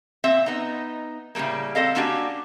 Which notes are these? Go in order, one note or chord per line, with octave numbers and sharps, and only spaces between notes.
A#2 C4 E5
B3 D#4
A2 C#3 G3 A3 A#3
C4 A4 D#5 F5
A#3 C#4 D4 F#4 G4